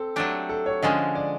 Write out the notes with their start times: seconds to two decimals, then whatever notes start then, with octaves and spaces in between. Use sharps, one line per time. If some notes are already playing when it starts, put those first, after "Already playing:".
Already playing: C4 A4
0.16 F#3 A3 D4 G4
0.49 A4
0.66 C#5
0.82 D3 F3 G#3 C#4 D#5
1.15 D5